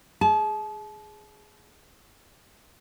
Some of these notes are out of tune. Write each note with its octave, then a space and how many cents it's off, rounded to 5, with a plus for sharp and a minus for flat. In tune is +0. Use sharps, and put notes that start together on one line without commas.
G#4 +0 A5 -35